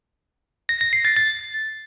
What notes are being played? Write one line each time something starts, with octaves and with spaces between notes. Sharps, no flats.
A#6
A#6
C7
A6
A6